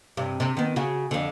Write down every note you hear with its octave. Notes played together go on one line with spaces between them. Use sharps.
G2 C3
C3
D#3 B3
C#3 F#4
F2 D3